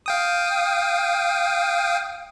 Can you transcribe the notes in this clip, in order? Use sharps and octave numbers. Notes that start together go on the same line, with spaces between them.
F5 G5 D#6